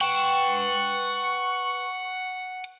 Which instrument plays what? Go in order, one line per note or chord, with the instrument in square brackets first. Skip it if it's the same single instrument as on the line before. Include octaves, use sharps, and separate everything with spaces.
[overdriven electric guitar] B4 G5 [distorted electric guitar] F#5 [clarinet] C#6